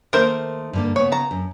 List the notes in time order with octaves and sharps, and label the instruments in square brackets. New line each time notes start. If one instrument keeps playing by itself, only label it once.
[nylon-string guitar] D#3 A3 A#3 [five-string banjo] A#4 C5 E5
[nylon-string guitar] G2 D3 A#3
[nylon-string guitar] C#3 B3 [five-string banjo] C#5
[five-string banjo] A5 A#5
[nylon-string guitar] F#2